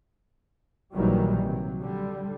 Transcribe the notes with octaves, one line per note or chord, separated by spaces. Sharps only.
A#1 A#2 D#3 E3 F#3 G3
C3 F#3
D3 G3